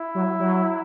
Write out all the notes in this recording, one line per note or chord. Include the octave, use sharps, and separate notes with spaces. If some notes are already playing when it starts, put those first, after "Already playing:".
Already playing: E4
F#3
F#3